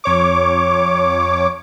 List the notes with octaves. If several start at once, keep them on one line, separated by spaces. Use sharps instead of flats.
F2 C#5 D6